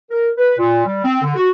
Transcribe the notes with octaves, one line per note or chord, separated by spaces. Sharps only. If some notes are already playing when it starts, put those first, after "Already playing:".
A#4
B4
A#2
G3
C4
D3
F#4